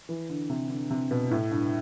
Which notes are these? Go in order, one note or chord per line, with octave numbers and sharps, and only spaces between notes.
E3
D3
C3
D3
C3
B2
A2
G2